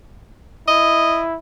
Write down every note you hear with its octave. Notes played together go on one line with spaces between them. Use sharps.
E4 D#5